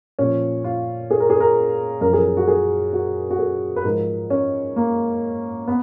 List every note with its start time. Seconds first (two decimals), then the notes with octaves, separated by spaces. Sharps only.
0.19 A#2 F3 C#4
0.64 F4
1.11 G#4
1.20 A#4
1.30 G#4
1.40 A#4
2.01 F#2 F3 A#4
2.13 G#4
2.25 A#4
2.37 F#4
2.48 G#4
2.93 F#4
3.31 F#4
3.39 G#4
3.76 B4
3.84 G#2 F3 A#4
4.30 C#4
4.76 A#3
5.68 B3